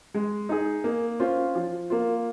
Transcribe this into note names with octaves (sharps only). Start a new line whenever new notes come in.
G#3
D#4 G#4
A#3
C#4 F4 C5
F3
A#3 F4